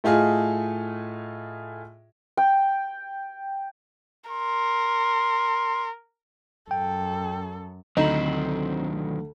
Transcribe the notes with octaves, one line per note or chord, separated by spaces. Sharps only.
A2 A3 F4 G#4 D#5
G5
A#4 C6
F#2 A4 G5
D2 D#3 F#3 C4 D#4 C5 A#5 B5